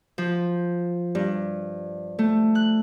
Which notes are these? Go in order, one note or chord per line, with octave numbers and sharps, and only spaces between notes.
F3
G2
A3
F#6